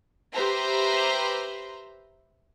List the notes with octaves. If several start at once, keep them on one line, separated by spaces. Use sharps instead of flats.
G4 B4 C5 E5 A#5 C6